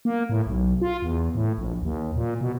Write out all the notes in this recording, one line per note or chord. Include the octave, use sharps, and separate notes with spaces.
A#3
A2
B1
F4
E2
A2
A#1
D#2
A#2
B2